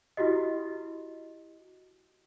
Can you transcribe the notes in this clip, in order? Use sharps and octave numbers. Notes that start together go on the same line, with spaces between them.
E4 F#4 G4 D#5